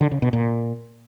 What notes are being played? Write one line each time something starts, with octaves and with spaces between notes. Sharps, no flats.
D3
C#3
B2
A#2